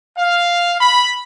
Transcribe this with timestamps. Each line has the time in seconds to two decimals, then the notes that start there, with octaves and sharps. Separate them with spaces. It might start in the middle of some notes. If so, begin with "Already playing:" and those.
0.18 F5
0.81 B5